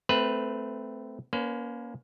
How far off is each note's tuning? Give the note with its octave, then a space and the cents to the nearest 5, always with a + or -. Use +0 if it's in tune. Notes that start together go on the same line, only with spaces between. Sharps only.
A3 +0 C4 -20 B4 +0
A#3 +25 C#4 +20 B4 +45